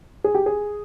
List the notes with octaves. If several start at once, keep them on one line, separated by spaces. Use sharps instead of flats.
G#4
G4
G#4